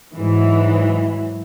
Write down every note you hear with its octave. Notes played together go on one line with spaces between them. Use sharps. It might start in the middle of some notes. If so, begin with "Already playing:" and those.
G#2 E3 F#3